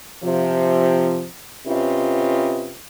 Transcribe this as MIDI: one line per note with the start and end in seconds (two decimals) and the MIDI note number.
0.24 1.25 48
0.24 1.25 53
1.67 2.74 48
1.67 2.74 61
1.67 2.74 65
1.67 2.74 71
1.67 2.74 75